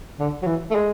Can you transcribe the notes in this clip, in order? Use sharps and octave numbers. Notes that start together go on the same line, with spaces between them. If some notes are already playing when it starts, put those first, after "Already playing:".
D3
F#3
E3
A3
G#3